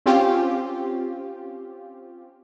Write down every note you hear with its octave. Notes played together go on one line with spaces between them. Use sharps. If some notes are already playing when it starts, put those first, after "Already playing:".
C4 C#4 F4 G4